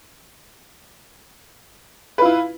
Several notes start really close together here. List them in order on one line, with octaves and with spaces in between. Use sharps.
B4 F4 E4